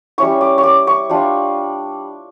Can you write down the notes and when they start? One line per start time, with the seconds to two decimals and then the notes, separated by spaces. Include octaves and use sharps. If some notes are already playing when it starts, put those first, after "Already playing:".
0.18 G3 C#4 E4 C#6
0.41 D6
0.58 C#6
0.63 D6
0.87 C#6
1.09 G3 D4 F4